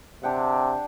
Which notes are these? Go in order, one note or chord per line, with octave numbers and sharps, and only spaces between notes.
C3 D4 G4 F#5